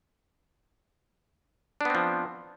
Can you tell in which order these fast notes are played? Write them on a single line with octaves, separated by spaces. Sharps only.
D4 B3 C4 F3